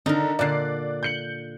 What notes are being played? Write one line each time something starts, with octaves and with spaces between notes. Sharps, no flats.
D3 D#3 D#4 A#4
A#2 D3 D5 F#6 C7
G6 C#7 F#7